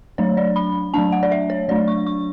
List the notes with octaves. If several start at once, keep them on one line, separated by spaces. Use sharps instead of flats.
F#3 A3 D4 C#5
D5
B5
F#3 A3 D4 A5
F#5
D5
E5
C#5
F#3 A3 D4 D5
C#6
C#6